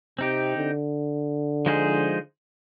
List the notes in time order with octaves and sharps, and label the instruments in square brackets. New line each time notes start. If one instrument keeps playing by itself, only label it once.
[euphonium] C3 [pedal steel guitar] C4 D#4 G4
[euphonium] D3
[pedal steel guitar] F3 G#3 D#4 G#4 C5